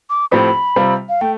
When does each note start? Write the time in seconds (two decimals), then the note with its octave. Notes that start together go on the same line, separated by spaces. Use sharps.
0.10 D6
0.31 A2 F3 C4 G4 B5
0.76 C3 G3 C4 F4
1.09 F5
1.21 A3 G5